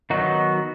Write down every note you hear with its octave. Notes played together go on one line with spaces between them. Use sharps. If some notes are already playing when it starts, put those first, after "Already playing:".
D#3 F#3 B3 D#4 F#4